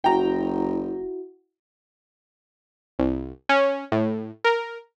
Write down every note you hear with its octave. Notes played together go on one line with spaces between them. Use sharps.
F#1 E4 F#4 G5 A#5
C2
C#4
A2
A#4